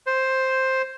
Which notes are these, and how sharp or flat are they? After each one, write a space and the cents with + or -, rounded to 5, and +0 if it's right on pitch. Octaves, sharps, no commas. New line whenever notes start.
C5 +5